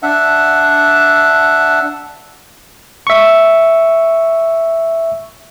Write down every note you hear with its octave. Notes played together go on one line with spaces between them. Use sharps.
D4 E5 F#5
E5 C#6